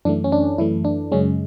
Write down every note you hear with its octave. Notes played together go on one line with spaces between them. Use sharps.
F#2 E3 A3 D4
C#4
D4
F#2 E3 A3 E4
D4
F#2 C#3 G#3 C#4